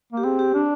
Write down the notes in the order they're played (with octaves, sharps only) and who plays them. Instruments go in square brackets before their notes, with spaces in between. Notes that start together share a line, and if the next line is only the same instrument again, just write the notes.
[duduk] A#3 [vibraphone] G4
[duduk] C4 [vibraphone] G#4
[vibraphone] G4
[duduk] D4